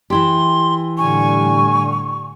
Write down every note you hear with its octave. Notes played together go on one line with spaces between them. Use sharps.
E3 E4 G4 C6
A2 D3 G3 G#5 C#6